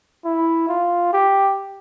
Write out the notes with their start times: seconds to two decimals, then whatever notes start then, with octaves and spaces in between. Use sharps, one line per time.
0.25 E4
0.69 F4
1.13 G4